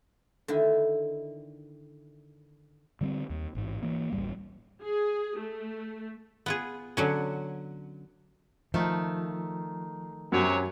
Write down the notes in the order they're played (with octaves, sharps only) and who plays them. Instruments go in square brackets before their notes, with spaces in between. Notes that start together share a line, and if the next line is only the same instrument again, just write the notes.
[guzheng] D3 D#3 E4 E5
[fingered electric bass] D3 G3 B3 C4
D#2
A1 G#2
E3 A#3
D1 A1 G#2 G3
[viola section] G#4
A3
[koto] B3 F4 G#4
D3 F#3 C#4
[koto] D#3 A3 [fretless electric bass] F3
[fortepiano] F#2 [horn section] C3 F#3 C#5